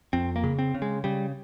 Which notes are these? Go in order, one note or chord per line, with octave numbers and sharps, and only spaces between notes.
F2 C4
A#3
C#3
C4
C#3
G#3
C#3 G3